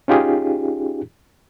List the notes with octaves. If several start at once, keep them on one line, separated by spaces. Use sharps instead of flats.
C#4 D#4 F4 G4 G#4